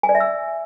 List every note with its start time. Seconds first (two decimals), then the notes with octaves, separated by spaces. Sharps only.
0.03 G#5
0.09 D5
0.15 E5
0.20 E6